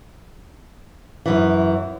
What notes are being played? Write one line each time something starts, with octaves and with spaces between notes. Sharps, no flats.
F#2 E3